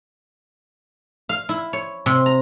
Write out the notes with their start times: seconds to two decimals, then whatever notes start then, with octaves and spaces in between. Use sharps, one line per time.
1.29 F5
1.49 E4
1.73 C#5
2.06 C3
2.26 A#5